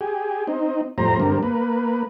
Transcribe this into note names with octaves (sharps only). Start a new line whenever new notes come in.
G4 G#4
C4 D#4
F2 A2 G3 C5 A#5
G2 D3 G3 C4 A#4
A#3 B4